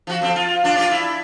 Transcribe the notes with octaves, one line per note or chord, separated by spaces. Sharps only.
F3 F#4
F2 C4
F4
D4 F4
F4 G4 D5
E4